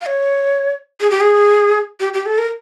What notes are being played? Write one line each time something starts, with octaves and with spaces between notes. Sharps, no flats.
F5
C#5
G#4
G4
G#4
G4
G4
A4
A#4